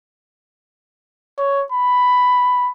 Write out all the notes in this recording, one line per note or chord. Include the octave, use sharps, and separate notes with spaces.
C#5
B5